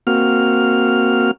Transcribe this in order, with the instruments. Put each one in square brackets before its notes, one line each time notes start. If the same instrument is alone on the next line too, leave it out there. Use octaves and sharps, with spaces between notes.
[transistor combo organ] A#3 C4 F#4 F6